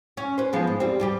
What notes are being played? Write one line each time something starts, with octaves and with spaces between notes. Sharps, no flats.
C#4
B4 C5
F3 G#3 B3
G#2
G3 C4
G2 G3 G4